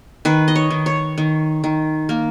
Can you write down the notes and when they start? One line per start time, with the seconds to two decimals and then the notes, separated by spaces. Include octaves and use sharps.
0.25 D#3 B4
0.48 D#5
0.55 C#5
0.70 D#3
0.86 C#5
1.18 D#3
1.64 D#3
2.09 A#3